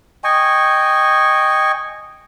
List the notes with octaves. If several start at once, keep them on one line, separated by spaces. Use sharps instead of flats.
D#5 G5 G#5 C#6